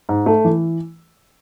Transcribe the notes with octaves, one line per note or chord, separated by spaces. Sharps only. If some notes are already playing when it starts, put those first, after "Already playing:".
G#2
A3
E3